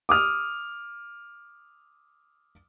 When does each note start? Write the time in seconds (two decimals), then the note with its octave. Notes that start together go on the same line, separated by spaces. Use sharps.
0.09 D6 D#6 F6